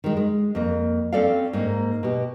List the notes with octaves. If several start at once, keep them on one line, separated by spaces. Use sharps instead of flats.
D#3 G#3
G#3
F2 A#3
C4 C#4 A4 D5 F5
G#2 A#3
B2 G4